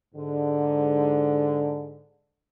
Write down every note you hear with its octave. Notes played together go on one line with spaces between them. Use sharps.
G#2 D3